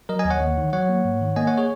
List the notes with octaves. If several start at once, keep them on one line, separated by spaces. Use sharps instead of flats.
F#3 A#4 D#5
D#5 G#5
D#2
C#5 F#5
D#2
D#3
F#3 C#5 F#5
A#3
G#2
D#3
A#3 D#5 G#5
C#5 F#5
G#4 C#5